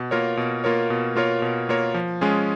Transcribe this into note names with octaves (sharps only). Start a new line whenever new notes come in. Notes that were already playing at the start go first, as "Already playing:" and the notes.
Already playing: B2
A#3 F4 A#4 C#5
B2
A#3 F4 A#4 C#5
B2
A#3 F4 A#4 C#5
B2
A#3 F4 A#4 C#5
F3
G#3 C#4 F4 G#4